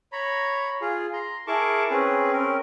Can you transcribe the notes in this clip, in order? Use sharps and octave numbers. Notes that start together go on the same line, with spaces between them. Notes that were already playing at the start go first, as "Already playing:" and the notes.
C#5 A#5 B5
F4 G#4
A#5 C6
E4 G#4 A#4 A5 C#6 D6
C4 C#4 G#4 B4
C4 C#4 A#4